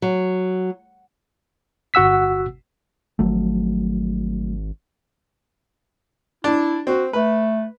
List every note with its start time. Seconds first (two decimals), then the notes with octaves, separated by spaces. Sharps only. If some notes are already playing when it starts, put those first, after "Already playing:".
0.02 F#3
1.94 G1 F#4 F#5 E6 B6
3.19 G#1 F3 F#3 A3
6.44 D4 E4
6.87 C4 F#4
7.13 A3 B4